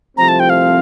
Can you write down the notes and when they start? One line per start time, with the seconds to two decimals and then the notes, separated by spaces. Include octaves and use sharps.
0.17 C2 C3 F3 A3 C4 A#5
0.29 A5
0.40 G5
0.50 F5